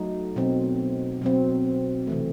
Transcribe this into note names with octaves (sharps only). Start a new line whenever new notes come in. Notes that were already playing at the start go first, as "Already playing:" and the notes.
Already playing: F#3 A3 D#4
B2 F#3 C4
B2 F#3 C4
C3 E3 A3